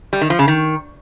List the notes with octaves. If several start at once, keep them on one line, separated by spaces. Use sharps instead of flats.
G3
D#3
F3
C#3
D#3